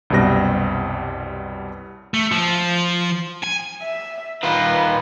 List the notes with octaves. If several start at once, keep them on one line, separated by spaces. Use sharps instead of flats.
C2 F#2 B2 G3 C4 A#6
A3
F3
G#5
E5
D#3 F4 B4